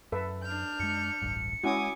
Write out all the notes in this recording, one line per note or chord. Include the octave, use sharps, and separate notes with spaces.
F#2 A4 B4 E5
D4 F6 G6
F#2 G#3 C#7
D1 A1 G2
G#3 C#4 E4 F#4 G#5 D6 D#6